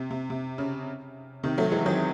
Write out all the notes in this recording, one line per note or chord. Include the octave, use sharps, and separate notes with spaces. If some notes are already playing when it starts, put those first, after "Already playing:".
Already playing: C3
C3
C3
C#3
C3 D#3
F#3 A3
E3 G#3
D#3 F#3